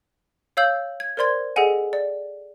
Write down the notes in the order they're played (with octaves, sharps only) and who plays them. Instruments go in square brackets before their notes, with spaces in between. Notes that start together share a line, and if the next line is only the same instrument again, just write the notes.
[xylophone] C#5 F5 E6 G6 F#7
G#6
A#4 C5 D5 C6 G#6
G#4 A4 D#5 F#5 G#5
D5